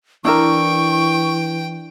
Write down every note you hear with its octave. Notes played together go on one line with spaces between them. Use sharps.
E3 D4 E4 A#4 G5 C#6